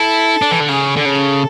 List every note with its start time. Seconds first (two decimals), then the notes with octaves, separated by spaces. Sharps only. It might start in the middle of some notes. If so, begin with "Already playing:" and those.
Already playing: E4 A4
0.42 D4
0.51 E3
0.60 D3
0.69 C#3 G#4
0.96 D3
1.05 C#3 A4